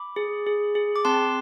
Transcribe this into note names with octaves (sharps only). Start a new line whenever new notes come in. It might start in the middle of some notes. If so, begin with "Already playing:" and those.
Already playing: B5 D6
G#4
G#4
G#4
D6
C4 A5 C6